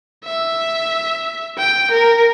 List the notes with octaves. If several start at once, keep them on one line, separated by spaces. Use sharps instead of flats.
E5
G5
A#4